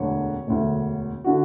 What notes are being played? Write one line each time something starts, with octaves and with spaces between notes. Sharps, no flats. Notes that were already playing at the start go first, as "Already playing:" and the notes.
Already playing: E1 D2 D3 C#5
E1 D2 D3
D3 F#4